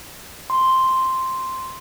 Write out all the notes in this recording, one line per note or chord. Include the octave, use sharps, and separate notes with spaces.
C6